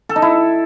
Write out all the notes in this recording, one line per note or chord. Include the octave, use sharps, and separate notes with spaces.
A4
D#4
E4